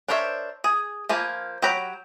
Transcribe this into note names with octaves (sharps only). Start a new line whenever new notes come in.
D4 A#4 C5 C#5 E5
G#4
F3 A#3 G#5 B5
F#3 G4 G5 A#5 B5